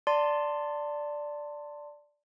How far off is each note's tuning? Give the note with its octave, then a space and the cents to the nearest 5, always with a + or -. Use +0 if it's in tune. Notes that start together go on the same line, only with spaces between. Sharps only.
D5 +0 A5 +25 C6 +0